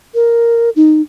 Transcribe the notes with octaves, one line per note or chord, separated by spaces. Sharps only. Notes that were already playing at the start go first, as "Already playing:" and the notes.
A#4
D#4